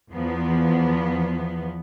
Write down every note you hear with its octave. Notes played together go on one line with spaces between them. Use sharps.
E2 F3 B3